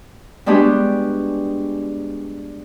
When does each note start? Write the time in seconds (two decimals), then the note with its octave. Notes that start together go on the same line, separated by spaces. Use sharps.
0.46 G3 G#3 B3 D4 F#4 G4